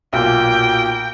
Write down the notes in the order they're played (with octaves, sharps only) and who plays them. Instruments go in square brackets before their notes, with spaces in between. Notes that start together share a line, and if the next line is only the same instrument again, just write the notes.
[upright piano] B1 A#2 [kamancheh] G5